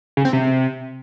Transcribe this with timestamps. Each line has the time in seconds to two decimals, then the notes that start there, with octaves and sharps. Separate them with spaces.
0.17 C#3
0.25 C4
0.33 C3